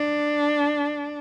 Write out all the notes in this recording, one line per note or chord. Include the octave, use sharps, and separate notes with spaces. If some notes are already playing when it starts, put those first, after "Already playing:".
Already playing: D4